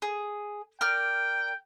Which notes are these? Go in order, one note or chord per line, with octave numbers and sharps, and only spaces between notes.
G#4
A#4 D5 G5 F6